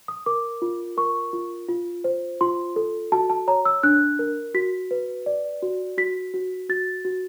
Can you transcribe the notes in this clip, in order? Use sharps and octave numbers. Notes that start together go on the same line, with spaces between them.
D#6
A#4 D6
F4
A#4 C#6
F4
F4
C5
F4 C6
A4
F#4 A5
A5
C#5 A#5
E6
D4 F#6
A#4
F#4 B6
B4
D5
F#4
F#4 B6
F#4
F#4 A6
F#4